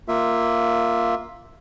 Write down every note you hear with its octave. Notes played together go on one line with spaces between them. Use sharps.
A#3 F4 E5